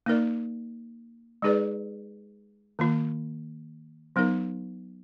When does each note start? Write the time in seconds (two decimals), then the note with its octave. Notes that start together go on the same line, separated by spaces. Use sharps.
0.06 A#3 D#4 A#4 D5
1.42 G#3 D#4 G#4 B4 D5
2.79 D#3 A#3 F4
4.16 F#3 B3 D#4 A#4